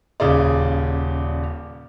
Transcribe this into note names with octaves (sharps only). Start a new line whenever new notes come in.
D#1 C#3 G#4 D5